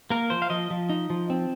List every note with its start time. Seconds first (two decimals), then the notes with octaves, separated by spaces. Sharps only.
0.10 A#3 A#4
0.30 F3 C5
0.42 F5
0.50 F3 D#5
0.71 F3
0.89 D#4
1.10 F3
1.30 C4